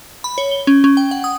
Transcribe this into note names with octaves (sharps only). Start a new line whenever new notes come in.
B5
C#5
G7
C#4
C#4
G5
F#5
D#6